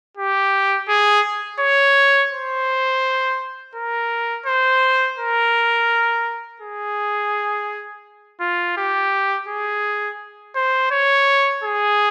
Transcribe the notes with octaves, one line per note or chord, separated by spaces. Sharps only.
G4
G#4
C#5
C5
A#4
C5
A#4
G#4
F4
G4
G#4
C5
C#5
G#4